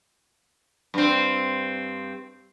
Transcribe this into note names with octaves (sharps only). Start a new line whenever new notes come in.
G2 C4